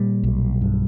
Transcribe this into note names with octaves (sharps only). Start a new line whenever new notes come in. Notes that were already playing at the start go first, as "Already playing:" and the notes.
Already playing: A#2 G3
B1
G2